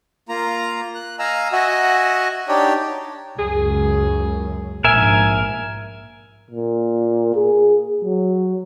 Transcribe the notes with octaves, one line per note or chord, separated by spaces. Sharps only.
A#3 F4 A#5
F#6
D#5 F5 G#5 A#5 E6
F#4 D#5 E5 F#5 G#5
D4 D#4 G4 C#5 D5 G5
C#2 F#2 G#4
A#1 G#2 A#4 E5 G#5
A#2
G#4
F#3